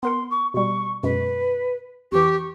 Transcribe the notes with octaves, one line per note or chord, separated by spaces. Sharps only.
B3 A#4 F#5 C6
C#6
B2 G3 C#6
F#2 B2 G#3 B4
F2 E3 G4 C#6